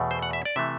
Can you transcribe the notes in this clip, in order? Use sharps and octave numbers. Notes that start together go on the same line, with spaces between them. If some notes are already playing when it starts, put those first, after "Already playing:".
Already playing: E2 B2 A3
C5
F#5
E5
D5
C3 E3 A3 E5